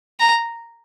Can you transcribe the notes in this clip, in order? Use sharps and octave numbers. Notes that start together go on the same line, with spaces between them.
A#5